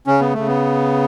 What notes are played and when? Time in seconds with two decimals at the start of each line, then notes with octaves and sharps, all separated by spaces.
0.07 C#3 C#4
0.20 B3
0.34 C#3 A3
0.48 B3